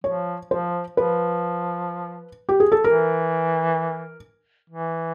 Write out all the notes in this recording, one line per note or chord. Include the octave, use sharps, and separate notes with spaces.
F3 C#5
F3 C5
F3 B4
G4
G#4
A4
E3 A#4
E3